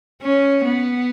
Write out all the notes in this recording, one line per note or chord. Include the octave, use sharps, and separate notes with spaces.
C#4
B3